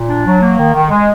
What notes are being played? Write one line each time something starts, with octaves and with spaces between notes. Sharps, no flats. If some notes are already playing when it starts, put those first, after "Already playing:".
Already playing: A#2
D4
F#3
A#3
D#3
D#3
G#3